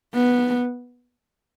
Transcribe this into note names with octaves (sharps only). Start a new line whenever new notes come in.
B3